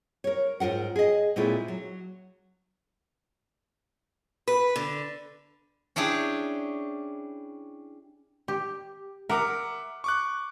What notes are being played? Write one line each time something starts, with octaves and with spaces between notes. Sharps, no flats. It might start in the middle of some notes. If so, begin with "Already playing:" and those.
A#4 C#5
G#2 F4 A#4 F#5
G#4 D#5
A#2 G#3 A3 C4 E4 F4
F#3
B4
D3
C#4 D4 E4 G4 G#4
G4
A#4 E5 F#5 D6
C#6 D6 F#6